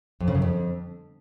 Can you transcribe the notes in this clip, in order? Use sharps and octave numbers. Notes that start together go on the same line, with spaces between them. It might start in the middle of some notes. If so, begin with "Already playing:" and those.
F2
C#3
F#2
F2